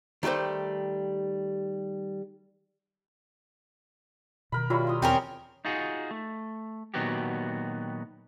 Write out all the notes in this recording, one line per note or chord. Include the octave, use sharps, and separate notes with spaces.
D#3 G3 A3 G4 C5
B2 D#3 A#4 B5
F#3 G3 E4 F4
C6 D#6
E2 C4 C#4 A#4
D#4 F4 F#4 G#4
A3
A#2 D#3 F#3 B3 F#4 G4